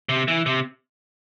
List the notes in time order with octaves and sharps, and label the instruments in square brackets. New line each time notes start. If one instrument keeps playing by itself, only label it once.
[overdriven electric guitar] C3
E3
C3